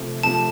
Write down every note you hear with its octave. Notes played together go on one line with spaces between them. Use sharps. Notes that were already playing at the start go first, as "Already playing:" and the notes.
Already playing: C3 F3 A3
C3 F3 A3 A5